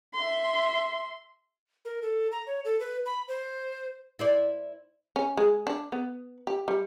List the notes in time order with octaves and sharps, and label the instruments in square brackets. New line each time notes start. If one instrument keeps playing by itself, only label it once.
[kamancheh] E5 C6
[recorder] A#4
A4
A#5
C#5
A4
B4
B5
C5
[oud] E4 C5 D5
[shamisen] C#4
G#3
D4
B3
G4
G3